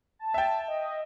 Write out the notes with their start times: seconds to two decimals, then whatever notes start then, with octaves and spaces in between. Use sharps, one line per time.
0.19 A5
0.34 E5 G5
0.68 D#5